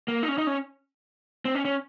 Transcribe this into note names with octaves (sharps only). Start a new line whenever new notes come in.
A#3
D#4
C#4
D#4
C#4
C4
C#4
C#4